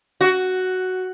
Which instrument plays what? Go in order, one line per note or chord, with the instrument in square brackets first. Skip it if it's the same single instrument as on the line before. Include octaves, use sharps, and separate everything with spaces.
[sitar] F#4